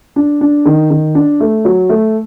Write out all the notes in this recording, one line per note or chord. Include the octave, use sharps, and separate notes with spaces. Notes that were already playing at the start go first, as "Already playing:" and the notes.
D4
D4
D#3
D#3
D4
A3
F#3
A3